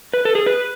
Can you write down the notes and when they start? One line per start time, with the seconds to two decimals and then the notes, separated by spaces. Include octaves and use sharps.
0.14 B4
0.25 A4
0.35 G#4
0.46 B4